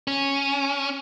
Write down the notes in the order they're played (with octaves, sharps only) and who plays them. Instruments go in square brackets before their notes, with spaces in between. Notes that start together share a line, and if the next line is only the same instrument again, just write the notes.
[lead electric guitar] C#4